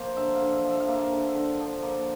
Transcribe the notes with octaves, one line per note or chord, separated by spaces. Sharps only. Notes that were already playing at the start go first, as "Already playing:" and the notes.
Already playing: F3 A#3 A#4 C5
D3 E5
F5
D3
E5
F3
E5
F5
A#3 E5
D3
D3
F3
A#3